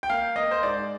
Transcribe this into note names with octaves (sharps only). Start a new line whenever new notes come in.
G5
A#3 F5
A#3 D#5
C5
G#2 D5